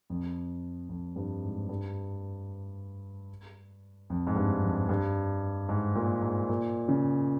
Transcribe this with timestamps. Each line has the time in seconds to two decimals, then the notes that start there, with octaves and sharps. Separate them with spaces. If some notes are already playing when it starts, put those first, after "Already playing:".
0.10 F2
0.89 F2
1.16 G2
1.43 G#2
1.69 G2
4.10 F2
4.27 G#2
4.36 G2
4.62 F2
4.89 G2
5.69 G#2
5.95 A#2
6.22 G#2
6.49 A#2
6.89 C#3